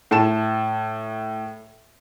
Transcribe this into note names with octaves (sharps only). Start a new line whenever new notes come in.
A2 A5 E7